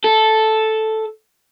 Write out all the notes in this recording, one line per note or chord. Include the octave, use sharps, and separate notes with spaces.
A4